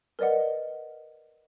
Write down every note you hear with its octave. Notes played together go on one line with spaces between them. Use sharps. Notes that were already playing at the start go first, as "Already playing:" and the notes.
A#4 B4 D5 D#5 F#5